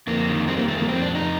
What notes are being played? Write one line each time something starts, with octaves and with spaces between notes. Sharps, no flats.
F2 A#3
D#3
G3 C4
A#3
F2 A3
A#3
F2 C4
D4
F2
D#4